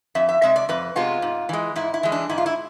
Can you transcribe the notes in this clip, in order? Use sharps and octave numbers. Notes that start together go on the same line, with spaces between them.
F2 E5
E5
C3 G#3 E5
D5
F2 B4
C3 G#3 B3 F4
G#2
E3 G#3
G#2 E4
E4
E3 G#3
D4
G#2 E4
F4
E4